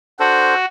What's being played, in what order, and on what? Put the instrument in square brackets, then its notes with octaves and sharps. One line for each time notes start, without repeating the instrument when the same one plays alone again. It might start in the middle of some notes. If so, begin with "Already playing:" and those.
[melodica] D4 A4 C5 [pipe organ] F#4